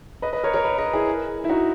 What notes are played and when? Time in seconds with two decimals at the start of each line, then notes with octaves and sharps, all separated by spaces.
0.22 B4 D#5
0.33 B4 D#5
0.43 A#4 C#5
0.54 A#4 C#5
0.64 B4 D#5
0.78 B4 D#5
0.93 E4 G#4
1.44 E4
1.49 D#4 F#4